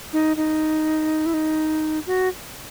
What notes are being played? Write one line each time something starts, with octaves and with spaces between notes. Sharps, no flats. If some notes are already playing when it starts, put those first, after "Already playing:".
D#4
D#4
E4
D#4
F#4